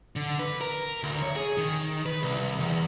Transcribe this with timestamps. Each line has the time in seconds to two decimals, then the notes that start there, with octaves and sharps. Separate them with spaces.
0.16 D3
0.39 B4
0.61 A#4
1.03 D2
1.23 C#5
1.36 G#4
1.58 D#3
2.06 B4
2.23 C2
2.60 E2